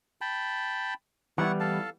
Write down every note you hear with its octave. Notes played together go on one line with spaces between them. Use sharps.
G5 A5 B5
E3 G3 B3 E4 F#5 C#6
A4 F5 A5